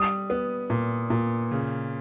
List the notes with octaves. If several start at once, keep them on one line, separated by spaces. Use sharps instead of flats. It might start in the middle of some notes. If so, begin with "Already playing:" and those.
Already playing: G3 D#6
B3
A#2
A#2
C#3